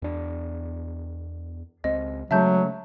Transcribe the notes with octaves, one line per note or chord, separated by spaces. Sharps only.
E2 D4
C#2 C4 D#5
C#3 F#3 G#3 A3 E5 A5 G6